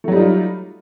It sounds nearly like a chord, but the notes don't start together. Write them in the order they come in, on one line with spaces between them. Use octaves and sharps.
A3 F#3 G3 D#4 F4